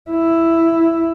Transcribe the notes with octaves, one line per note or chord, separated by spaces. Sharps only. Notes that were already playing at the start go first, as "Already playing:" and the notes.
E4